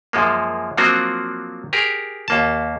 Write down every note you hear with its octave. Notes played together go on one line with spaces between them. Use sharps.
F#2 F3 G#3 A#3
F3 F#3 A#3 C4 D4 F#4
G4 G#4 A#4
D#2 A#3 A5